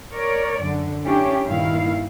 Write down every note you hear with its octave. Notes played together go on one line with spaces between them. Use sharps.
A#4 C#5 D5
F#2 D3
C#4 D4 E4 G4 C#5
G2 A#2 D#3 E4 F5